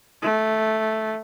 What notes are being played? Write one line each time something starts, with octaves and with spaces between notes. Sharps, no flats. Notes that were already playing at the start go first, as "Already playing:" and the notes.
A3